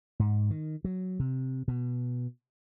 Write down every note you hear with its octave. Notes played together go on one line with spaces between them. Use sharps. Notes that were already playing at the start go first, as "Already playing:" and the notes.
G#2
D#3
F#3
C3
B2